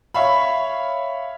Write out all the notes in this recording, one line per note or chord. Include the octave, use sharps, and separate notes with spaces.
C#5 E5 F5 B5